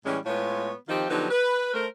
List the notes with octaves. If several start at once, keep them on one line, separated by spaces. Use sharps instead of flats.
A2 E3 G3 G#3 C#4
A2 G#3 B3 F4 C#5
D#3 F3 C4 D#4 F4 G4
D3 F3 F#3 B3 D#4 G4
B4
A3 A#4 C5